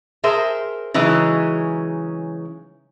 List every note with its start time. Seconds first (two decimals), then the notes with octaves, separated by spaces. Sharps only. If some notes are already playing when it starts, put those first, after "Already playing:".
0.24 G#4 A#4 C5 E5
0.94 C#3 E3 F#3 G#3 D#4